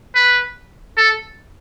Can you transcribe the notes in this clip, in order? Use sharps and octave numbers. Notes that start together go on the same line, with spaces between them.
B4
A4